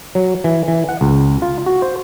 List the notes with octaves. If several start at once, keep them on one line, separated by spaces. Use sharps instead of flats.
F#3
E3
E3
F#5
C#2
F4
F#4
C5